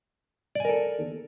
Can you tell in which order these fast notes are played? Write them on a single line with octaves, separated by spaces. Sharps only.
D5 G#5 A#4 A4